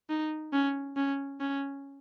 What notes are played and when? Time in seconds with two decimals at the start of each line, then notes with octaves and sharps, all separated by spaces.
0.10 D#4
0.53 C#4
0.97 C#4
1.41 C#4